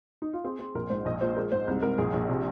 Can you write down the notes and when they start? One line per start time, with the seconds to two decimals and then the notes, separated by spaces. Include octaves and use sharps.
0.22 D#4
0.33 F4
0.44 C4 G#4
0.59 C4
0.75 A#1 A#4
0.90 G#2 C5
1.05 A#1 D#5
1.21 A#2 C5
1.36 G#3 A#4
1.52 G#2 C5
1.68 C2
1.82 C2 A#4
1.98 A#1 G#4
2.13 A#1
2.29 C3